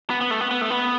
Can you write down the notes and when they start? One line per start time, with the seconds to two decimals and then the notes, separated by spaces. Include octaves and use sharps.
0.10 B3
0.21 B3
0.31 A3
0.41 B3
0.51 B3
0.61 A3
0.70 B3